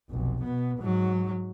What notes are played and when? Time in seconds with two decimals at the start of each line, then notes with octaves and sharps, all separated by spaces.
0.10 F1 B1
0.42 B2 B3
0.78 G#2 F#3